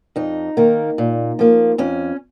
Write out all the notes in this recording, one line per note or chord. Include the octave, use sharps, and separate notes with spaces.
F2 D#4
D#3 A#3
A#2
F3 A#3
F2 C#4